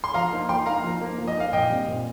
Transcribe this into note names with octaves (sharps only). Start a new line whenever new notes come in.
C6
F3 F5 A#5
A#3 D#4
F3 G5 C6
A#3 D#4 F5 A#5
F3
A#3 D#4
F3
D#5
A#3 D#4 F5
A#2 D#5 G5
G3 C4
A#2